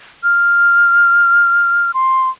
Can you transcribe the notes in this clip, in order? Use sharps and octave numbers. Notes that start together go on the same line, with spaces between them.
F6
C6